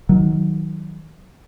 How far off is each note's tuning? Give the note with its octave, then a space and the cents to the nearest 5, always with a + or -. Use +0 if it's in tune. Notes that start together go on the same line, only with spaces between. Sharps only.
D#3 +20 F#3 +0